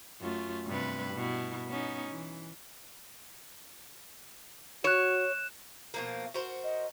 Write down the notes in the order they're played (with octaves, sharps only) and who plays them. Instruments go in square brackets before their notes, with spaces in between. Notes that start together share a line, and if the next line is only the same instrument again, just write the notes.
[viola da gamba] F#2 A3 F4
G2 C3 B4
B2 E4
B3 C#4 D#4
E3
[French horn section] F#4 [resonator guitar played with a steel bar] C#5 [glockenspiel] F#6 E7
[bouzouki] B2 F3 A#3
F#4 A#4 C5
[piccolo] D#5